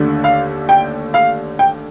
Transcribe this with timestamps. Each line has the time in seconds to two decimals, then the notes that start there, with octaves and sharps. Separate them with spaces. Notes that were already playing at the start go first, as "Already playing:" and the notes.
Already playing: D#2 D3 A3 D4
0.24 F5
0.69 G5
1.14 F5
1.59 G5